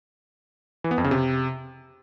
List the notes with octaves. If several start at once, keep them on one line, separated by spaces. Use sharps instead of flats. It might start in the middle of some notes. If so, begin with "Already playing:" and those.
E3
B3
F2
C#3
C3